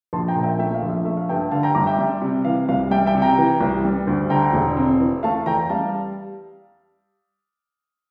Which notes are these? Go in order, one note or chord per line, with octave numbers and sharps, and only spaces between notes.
A#1 A5 C6
G5 A#5
A#2
E5 G5
A3 E5 G5
F5
A#1
E5
A3 E5
F5
G2 E5 G5
D3 F5 A5
G5 A#5
G1 A#5 D6
E5 G5
G3
C3
E3 F5
C2 F5
G3 E5 G5
E5 G5
C3
G5 A#5
E3
C2
G3
D2
D3 G5 A#5
E1
C4
E3
A3 F5 A5
E2 G5 A#5
G3 F5 A5